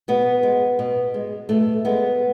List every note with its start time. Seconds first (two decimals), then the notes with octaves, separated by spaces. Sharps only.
0.08 B2 B3
0.43 G#3
0.79 B2
1.14 G#3
1.49 B2 A3
1.85 G#3 B3